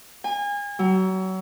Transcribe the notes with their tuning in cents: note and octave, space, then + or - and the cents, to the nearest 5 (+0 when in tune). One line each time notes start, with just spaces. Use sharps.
G#5 -30
F#3 +30